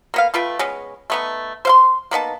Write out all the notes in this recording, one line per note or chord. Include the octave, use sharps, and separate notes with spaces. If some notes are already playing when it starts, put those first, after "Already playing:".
A#3 B3 F5
A3 F4 B4 G5
G#3 B3 C#4
A3 B3 D#4
C5 F5 C6
A#3 B3 D#4 A5